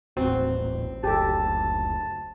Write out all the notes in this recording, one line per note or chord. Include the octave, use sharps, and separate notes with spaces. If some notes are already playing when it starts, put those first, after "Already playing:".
D#1 A1 C4 F#4
F#1 D2 G4 A4 A5